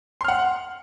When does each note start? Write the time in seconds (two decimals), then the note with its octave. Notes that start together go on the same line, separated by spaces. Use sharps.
0.21 C6
0.25 F6
0.28 F#5